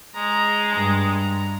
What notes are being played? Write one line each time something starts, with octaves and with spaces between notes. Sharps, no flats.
G#3 A#5
G2 A#5